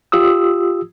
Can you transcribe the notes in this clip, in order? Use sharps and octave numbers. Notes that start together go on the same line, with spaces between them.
F4 G4 D#6 E6